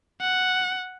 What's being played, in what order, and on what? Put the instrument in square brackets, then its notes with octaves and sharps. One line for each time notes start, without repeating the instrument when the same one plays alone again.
[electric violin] F#5